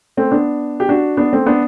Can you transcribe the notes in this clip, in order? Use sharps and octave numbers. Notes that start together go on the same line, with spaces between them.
A3 C4
B3 D4
G4
D4 F#4
B3 D4
A3 C4
B3 D4